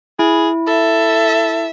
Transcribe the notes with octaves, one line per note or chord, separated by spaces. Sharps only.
E4 G#4
A4 E5